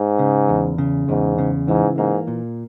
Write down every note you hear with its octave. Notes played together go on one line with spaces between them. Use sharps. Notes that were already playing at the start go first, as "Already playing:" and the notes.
Already playing: G#2
C#3
E2
C#3
E2 G#2
C#3
G#2 E3
G#2 A#3
A#2